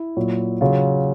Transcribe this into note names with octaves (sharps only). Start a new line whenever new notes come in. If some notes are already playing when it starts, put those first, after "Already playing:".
Already playing: E4
A#2 F#3
C#3 F#3 F4